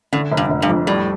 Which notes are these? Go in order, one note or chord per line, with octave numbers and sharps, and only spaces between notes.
A2 D3
F1
G2
F1
G2
F2
A2 G3